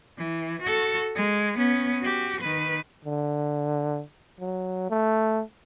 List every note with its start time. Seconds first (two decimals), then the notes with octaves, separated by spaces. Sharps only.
0.17 E3
0.62 F#4 A4
1.15 G#3
1.57 B3 C#4
2.02 F#4 G4
2.41 D#3 B4
3.05 D3
4.40 F#3
4.90 A3